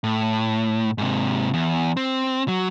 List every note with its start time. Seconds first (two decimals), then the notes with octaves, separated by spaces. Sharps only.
0.04 A2
0.98 G#2 C3
1.54 E2
1.97 C4
2.48 F#3